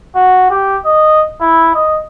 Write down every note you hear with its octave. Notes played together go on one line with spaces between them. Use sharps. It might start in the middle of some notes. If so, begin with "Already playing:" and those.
F#4
G4
D#5
E4
D#5